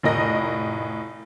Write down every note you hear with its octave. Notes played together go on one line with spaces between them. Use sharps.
F1 A2 A#4 D#5 A#6